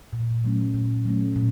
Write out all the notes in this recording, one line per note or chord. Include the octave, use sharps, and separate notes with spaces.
A#2
F#3 A3 C#4
A#2
F#3 A3 C#4
A#2